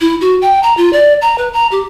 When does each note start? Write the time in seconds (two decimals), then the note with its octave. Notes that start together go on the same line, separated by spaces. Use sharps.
0.01 E4
0.21 F#4
0.42 G5
0.63 A#5
0.77 F4
0.93 D5
1.22 A#5
1.38 B4
1.53 A#5
1.72 G4